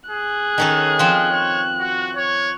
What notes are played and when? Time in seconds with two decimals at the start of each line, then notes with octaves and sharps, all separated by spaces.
0.10 G#4 F#6
0.58 D#3 C#4 A4
0.99 F3 C4 F4
1.31 C#5
1.80 F#4
2.16 C#5